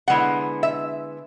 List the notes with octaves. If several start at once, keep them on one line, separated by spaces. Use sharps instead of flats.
D3 G#3 B3 E4 F#5
E5